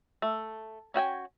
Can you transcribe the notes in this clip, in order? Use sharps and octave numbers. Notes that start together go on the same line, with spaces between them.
A3
C#4 F#4 G5 G#5